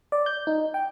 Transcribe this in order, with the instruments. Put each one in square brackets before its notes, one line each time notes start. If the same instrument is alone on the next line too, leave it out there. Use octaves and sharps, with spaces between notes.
[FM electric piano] D5
G6
D#4
G5